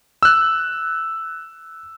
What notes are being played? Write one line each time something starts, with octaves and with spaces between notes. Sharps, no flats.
E6 F#6